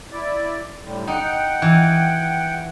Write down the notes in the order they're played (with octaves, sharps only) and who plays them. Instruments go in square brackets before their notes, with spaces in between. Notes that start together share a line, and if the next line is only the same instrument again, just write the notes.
[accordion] E4 D5
A2 D3 G3
[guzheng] D#4 [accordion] F#5 G5
[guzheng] E3